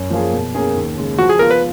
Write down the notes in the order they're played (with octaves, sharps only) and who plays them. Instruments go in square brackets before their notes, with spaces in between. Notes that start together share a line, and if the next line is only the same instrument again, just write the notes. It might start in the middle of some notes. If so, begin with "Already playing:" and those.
Already playing: [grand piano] F#2
F3 A#3 F4 G#4
B2
A#3 C#4 G#4
D#2
C#3 G#3
[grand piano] F3 [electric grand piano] F#4
[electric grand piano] G#4
[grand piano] B3 F4 [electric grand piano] A#4
[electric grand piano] B4